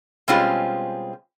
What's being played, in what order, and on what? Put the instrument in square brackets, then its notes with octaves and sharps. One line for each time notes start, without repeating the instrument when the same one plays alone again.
[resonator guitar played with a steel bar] B2 G3 G#3 C4 C#4 F4